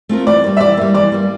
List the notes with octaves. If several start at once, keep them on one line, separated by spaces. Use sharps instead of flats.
A3 C4 F4 A#4
E3 D5
G3 A#3
E5
E3 D5
G3 A#3
E3 D5
G3 A#3